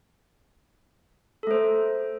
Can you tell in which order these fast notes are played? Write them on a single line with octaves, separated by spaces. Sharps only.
A4 A3 C5